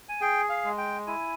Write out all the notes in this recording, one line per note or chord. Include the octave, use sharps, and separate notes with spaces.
G#5
G#4 G5
F5
G#3
G5
E4 G#5